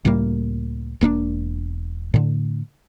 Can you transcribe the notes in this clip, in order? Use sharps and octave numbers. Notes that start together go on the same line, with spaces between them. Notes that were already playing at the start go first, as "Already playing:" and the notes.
C#2 A2 G3 A#3
E1 A#3 C#4 D4
A2 D3